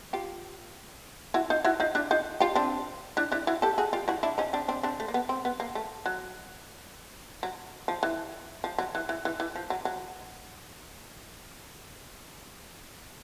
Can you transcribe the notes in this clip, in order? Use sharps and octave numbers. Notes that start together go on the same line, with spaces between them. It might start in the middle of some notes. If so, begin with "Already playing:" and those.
F4 G4
E4 F#4
D#4 F4
E4 F#4
D#4 F4
D4 E4
D#4 F4
F4 G4
C4 D4
D4 E4
D4 E4
E4 F#4
G4 A4
F#4 G#4
F4 G4
E4 F#4
D4 E4
C#4 D#4
C4 D4
C4 D4
C4 D4
A3
A#3
B3
C4
B3
A#3
A3
F#3
F#3
F3
E3
F3
F#3
E3
E3
E3
E3
F3
F#3
F#3